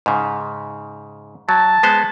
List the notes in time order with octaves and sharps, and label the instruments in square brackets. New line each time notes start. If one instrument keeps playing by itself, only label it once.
[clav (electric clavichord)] G#2 C#3
[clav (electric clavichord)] F#3 [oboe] A5
[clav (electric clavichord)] G#3 B3 C5